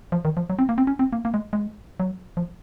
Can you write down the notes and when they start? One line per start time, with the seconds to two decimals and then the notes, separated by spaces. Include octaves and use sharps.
0.12 F3
0.25 D#3
0.37 F3
0.50 F#3
0.59 C4
0.69 A#3
0.78 C4
0.87 C#4
0.99 C4
1.13 A#3
1.25 A#3
1.34 G#3
1.53 G#3
2.00 F#3
2.37 F3